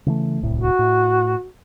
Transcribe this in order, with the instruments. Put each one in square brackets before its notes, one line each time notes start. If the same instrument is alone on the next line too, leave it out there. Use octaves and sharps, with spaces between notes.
[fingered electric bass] C#3 E3 A3
D1 C2 A2
[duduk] F#4
[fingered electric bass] A2